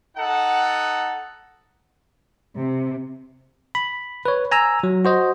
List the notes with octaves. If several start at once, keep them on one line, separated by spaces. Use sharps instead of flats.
D#4 A4 F#5
C3
B5
B4 C#5
G#5 A#5 E6
F#3
F#4 C5 D#5